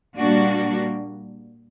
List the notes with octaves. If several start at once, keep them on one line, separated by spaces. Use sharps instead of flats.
A#2 G3 A#3 D4 F#4